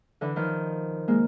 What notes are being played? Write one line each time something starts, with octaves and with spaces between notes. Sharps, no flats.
D3 E3
D#3 F3
G#3 A#3